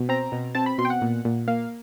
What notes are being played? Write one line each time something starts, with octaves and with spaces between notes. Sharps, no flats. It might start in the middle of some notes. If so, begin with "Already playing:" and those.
Already playing: B2
C4 A#5
B2
C4 A5
B5
B2 C6
G5
F#5
A#2
A#2
A#3 F5